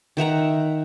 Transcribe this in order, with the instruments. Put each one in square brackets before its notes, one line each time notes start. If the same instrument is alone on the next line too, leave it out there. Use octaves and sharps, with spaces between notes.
[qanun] D#3 E5 F#5 A#5